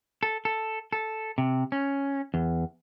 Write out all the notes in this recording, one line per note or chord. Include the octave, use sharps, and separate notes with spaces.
A4
A4
A4
C3
C#4
E2